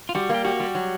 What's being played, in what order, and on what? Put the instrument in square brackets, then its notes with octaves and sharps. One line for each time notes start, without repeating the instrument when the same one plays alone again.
[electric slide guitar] F4
[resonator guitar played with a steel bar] G3 [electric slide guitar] F#4
[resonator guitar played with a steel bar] A#3 [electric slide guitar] G4
[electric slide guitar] F#4 [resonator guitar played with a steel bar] G4
[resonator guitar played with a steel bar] G3
F#3